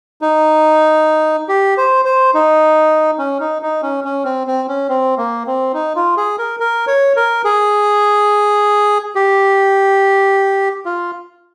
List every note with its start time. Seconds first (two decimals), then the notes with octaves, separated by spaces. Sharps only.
0.21 D#4
1.49 G4
1.78 C5
2.05 C5
2.34 D#4
3.19 C#4
3.40 D#4
3.62 D#4
3.82 C#4
4.04 C#4
4.25 C4
4.47 C4
4.68 C#4
4.89 C4
5.18 A#3
5.47 C4
5.74 D#4
5.96 F4
6.17 G#4
6.39 A#4
6.60 A#4
6.87 C#5
7.16 A#4
7.45 G#4
9.15 G4
10.85 F4